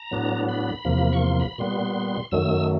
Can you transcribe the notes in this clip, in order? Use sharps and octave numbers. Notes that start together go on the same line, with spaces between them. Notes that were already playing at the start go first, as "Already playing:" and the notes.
Already playing: A#5
A2 F#3 B3 D4
B5
E2 C3 F3 A#3
C#6
C6
B5
A#2 G3 B3 C6
F#2 D#3 F#3 A3 E6